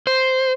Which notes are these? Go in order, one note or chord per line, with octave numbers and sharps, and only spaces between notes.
C5